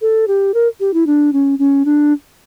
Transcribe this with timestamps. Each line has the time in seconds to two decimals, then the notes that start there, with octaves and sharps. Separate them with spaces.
0.02 A4
0.28 G4
0.54 A#4
0.80 G4
0.94 E4
1.07 D4
1.33 C#4
1.59 C#4
1.85 D4